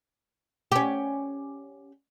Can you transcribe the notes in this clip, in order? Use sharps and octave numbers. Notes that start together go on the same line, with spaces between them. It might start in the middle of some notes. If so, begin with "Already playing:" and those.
C#4 G4